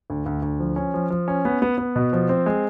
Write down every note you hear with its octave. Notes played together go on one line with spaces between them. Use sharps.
D2
D2
D2
F3
C#4
F3
F3
C#4
B3
B3
B3
B2
F3
C4
G#3